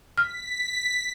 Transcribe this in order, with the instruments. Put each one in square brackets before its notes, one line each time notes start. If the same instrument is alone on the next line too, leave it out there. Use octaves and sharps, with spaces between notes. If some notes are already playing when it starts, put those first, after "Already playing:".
[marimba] F6 [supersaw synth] B6